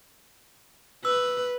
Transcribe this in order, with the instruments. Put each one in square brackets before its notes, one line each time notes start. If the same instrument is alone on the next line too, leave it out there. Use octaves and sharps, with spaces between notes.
[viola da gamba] B4 [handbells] E6